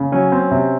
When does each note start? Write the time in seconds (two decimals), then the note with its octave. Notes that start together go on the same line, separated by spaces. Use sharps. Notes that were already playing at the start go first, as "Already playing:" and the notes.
Already playing: C#3
0.12 F#3 C#4
0.32 C4
0.51 C3